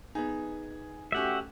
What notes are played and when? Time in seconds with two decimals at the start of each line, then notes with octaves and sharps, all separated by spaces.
0.15 B3 D#4 G#4
1.12 A3 C#4 F#4 G4 E5 F#5